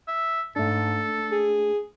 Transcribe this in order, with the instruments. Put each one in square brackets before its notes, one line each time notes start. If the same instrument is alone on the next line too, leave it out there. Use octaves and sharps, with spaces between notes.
[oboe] E5
[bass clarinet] G#2 [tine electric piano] A3 D4 [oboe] A4
[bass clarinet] G#4